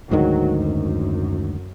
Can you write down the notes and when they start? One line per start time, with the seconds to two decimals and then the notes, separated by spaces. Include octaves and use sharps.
0.11 D2 G#2 D#3 F#3
0.60 F#2